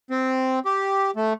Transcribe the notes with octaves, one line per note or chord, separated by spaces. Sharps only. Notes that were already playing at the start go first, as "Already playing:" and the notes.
C4
G4
A3